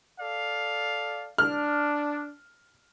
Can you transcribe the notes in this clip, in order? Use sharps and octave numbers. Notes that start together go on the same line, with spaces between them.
A4 D5 F5
D4 F6